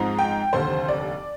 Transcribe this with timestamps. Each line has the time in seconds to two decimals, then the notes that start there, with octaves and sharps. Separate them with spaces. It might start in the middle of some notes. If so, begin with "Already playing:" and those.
Already playing: G#2 F3 G#3 C4 D#4
0.19 G5
0.53 F1 D#2 D3 C5
0.88 D5